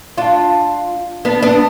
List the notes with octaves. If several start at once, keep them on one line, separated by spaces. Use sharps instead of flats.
D4 F4
B3 D4
B3 D4